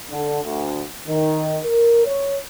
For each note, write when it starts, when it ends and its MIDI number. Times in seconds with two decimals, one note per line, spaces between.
0.10 0.42 50
0.43 0.82 38
1.08 1.56 51
1.63 2.04 70
2.04 2.35 73